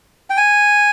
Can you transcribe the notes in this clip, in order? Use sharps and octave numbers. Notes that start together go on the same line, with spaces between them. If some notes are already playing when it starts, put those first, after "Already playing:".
G5
G#5